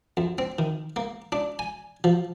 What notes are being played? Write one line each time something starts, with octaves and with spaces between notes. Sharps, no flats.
F2
C4
D#3
A#3
D4
G#5
F3